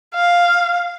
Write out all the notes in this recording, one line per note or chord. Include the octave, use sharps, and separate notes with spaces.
F5